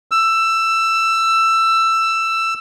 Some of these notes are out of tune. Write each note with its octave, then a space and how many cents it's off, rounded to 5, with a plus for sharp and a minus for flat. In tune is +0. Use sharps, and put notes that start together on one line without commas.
E6 +15